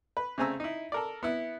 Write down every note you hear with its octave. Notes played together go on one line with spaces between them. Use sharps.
B4
C#3 A3 C4 G#5 A#5 E6
D#4 E4
A4 A#4 D5
B3 E4